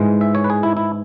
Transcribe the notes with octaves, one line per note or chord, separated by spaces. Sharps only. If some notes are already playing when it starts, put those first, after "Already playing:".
Already playing: G#2 E3 G#3
E5
C#5
B4
G#4
E4
E4